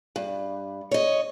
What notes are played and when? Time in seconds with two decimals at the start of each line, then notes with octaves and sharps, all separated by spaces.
0.16 G2
0.91 C#5 D#5